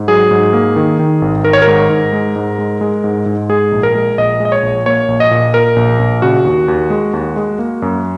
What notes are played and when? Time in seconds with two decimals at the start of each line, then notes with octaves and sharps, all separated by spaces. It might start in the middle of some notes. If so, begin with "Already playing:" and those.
Already playing: G#2
0.08 F#3 G#4
0.31 G#2
0.53 A#3
0.76 D#3
0.99 D#3
1.22 G#1
1.44 D#3 A#4
1.53 C#5
1.62 A#4
1.67 G#2
1.90 G#2
2.13 G#3
2.36 G#2
2.58 G#3
2.81 G#3
3.04 G#2
3.26 G#2
3.49 G#3 G#4
3.72 A#1
3.83 A#4
3.95 G#3
4.18 A#1 D#5
4.40 G#3
4.45 D#5
4.52 C#5
4.63 A#1
4.86 A#3 C#5
5.08 A#1
5.20 D#5
5.31 A#2
5.54 A#2 A#4
5.76 A#1
5.99 A#1
6.22 C#3 F#4
6.44 D#2
6.68 D#2
6.90 G#3
7.13 D#2
7.36 G#3
7.59 A#3
7.82 F#2